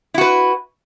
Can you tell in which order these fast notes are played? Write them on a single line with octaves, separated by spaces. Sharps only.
E4 F#4 B4